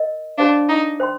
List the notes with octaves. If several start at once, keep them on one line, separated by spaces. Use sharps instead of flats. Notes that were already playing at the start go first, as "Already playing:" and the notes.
Already playing: A#4 D#5
D4 G4 C5 F5
D#4
C5 G5 C6